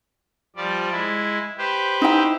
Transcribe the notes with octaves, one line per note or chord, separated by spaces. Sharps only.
F3 G3 D5
G#3 E4
G4 B4 C5
D#4 E4 G5